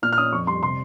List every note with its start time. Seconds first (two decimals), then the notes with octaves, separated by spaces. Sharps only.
0.02 A#2 F6
0.13 F6
0.18 C#4 D#6
0.32 F2 C#6
0.47 G3 C6
0.62 C3 C6